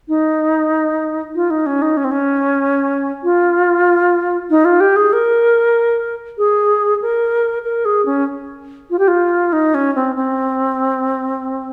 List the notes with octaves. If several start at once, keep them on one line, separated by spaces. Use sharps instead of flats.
D#4
F4
D#4
C#4
D#4
C#4
C4
C#4
F4
D#4
F4
G4
G#4
A#4
G#4
A#4
A#4
G#4
C#4
F4
G4
F4
D#4
C#4
C4
C4